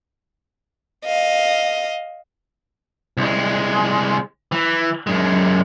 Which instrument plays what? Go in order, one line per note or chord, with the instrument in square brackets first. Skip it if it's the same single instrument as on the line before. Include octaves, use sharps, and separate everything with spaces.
[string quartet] D#5 F5
[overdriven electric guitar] C2 G#3
E3
F#2 G#3